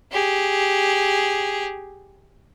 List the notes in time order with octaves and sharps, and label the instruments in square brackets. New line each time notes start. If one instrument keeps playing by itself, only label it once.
[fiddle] G4 G#4